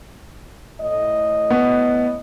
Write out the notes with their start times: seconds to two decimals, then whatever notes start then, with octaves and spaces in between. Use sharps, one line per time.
0.81 A2 D#5
1.51 B3